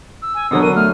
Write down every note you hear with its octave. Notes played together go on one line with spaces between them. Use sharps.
E6
G#5
B2 D3 F#3 D#6
A#4 D#7
A3 F6